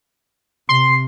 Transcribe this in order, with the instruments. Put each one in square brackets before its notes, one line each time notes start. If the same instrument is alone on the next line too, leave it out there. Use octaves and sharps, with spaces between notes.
[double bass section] C3 [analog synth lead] C6